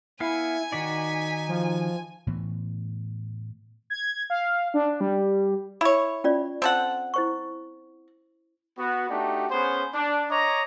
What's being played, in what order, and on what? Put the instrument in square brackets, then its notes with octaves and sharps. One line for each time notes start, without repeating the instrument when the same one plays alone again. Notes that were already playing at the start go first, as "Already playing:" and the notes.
[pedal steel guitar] B3 F5 [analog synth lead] E4 [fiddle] G#5
[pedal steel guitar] D#3 F#4 D5 [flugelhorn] D#4 [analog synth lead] B6
[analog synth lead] F3
[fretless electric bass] A2 E3 B3
[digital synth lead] G#6
F5
D4
G3
[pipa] E4 C#5 [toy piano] B5
[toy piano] C#4 F4 D5
[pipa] C4 A4 F#5
[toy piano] E4 C5 C#6
[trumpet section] B3 F#4
A3 D4 D#4 F#4 G4
B3 C#4 G#4 C5
D4
C#5 D#5 A#5 D6